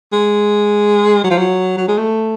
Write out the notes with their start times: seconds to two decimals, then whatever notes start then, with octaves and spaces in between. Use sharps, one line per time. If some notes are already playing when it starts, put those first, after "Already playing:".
0.13 G#3
1.24 F#3
1.31 F3
1.38 F#3
1.78 F#3
1.88 G#3
1.98 A3